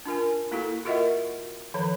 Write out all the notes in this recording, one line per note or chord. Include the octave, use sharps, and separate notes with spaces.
D4 F4 A#4 G#5
A#3 E4 F#4 A4
F4 F#4 A#4 D#5 E5 F#5
D#3 F3 C#5